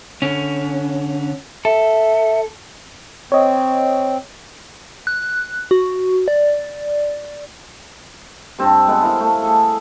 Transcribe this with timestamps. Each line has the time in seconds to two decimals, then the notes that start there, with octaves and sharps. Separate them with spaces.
0.22 D3 C#4
1.65 A4 E5
3.32 C4 C#5 D#5
5.07 F#6
5.71 F#4
6.28 D5
8.59 G2 C4 A5
8.87 G#3 B3 A4
9.02 E4 A#4 F5
9.20 A3
9.43 G#4 A4